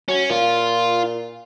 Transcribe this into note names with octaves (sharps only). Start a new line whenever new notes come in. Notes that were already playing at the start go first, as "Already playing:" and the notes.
F#3 C#4
A#2 F4